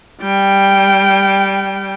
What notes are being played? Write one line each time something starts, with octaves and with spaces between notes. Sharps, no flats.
G3 G5